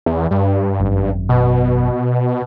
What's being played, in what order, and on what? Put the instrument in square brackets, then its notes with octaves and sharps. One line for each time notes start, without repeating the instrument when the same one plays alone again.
[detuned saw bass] E2
G2
[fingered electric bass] G#1 F#2
[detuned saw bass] B2